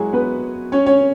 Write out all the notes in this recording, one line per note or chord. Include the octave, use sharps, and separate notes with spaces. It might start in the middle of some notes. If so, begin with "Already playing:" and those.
Already playing: F#3 G#3 E4 F#4 G#4
B3 B4
C#4 C#5
C#4 C#5